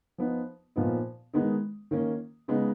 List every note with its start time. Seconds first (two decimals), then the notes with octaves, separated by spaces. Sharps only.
0.18 F3 B3 D#4
0.76 A#2 F3 B3 D#4
1.33 D#3 G#3 B3 D#4
1.91 D#3 A#3 C#4
2.48 C#3 G#3 B3 D#4